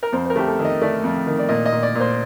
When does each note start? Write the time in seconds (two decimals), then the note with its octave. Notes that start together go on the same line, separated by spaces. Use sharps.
0.03 A#4
0.13 F2 C5
0.25 C5
0.30 A#4
0.36 A3 G4
0.47 A4
0.59 D#3
0.65 D#5
0.82 A3 D5
1.04 F2
1.27 D#3
1.39 D5
1.49 A#2 D#5
1.66 D#5
1.72 A#2
1.83 D5
1.95 A#2 C5